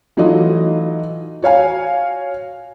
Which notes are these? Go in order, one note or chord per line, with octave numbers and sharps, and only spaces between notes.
E3 F#3 A3 D#4 F4 D#5
F#4 C#5 F5 G#5